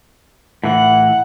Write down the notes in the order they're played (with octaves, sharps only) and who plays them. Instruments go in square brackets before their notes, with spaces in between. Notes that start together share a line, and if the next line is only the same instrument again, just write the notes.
[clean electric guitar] A2 E3 [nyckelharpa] F#5